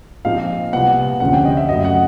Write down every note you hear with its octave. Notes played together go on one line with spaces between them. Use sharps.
A#2 F3 G#3 C4 D#4 F5
C2 A#2 G3 B3 F#5
D2 C3 F3 G#3 C#4 F#5
G5
D#5
E5
F#2 C#3 F#3 A3 D#5
F#5